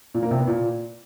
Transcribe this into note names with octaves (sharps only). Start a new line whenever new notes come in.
A#2
A#3
C3
B3
A#2